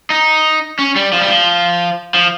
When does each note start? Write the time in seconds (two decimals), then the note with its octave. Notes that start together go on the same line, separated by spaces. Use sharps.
0.10 D#4
0.79 C#4
0.96 G3
1.13 F3
1.20 G3
1.28 F3
2.14 F3